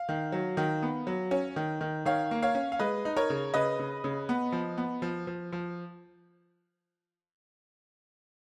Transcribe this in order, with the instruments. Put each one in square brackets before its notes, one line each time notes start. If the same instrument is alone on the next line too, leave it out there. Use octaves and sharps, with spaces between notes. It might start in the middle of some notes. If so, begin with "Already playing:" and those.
Already playing: [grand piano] F5
D#3
F#3
D#3
B3
F#3
C#4
D#3
D#3
D#3 C#5 F5
A#3
C#5 F5
C#4
F5
G#3 B4 D#5
D#4
A#4 C#5
C#3
C#3 B4 D#5
C#3
C#3
B3
F3
B3
F3
F3
F3